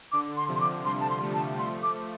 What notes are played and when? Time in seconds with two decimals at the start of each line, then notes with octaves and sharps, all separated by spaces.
0.12 D3 D6
0.37 C6
0.48 C3 F3
0.56 C6
0.61 D6
0.85 D3 G3 C6
1.01 A5
1.10 C6
1.22 F3 A3
1.34 A5
1.58 F3 A3 C6
1.83 D6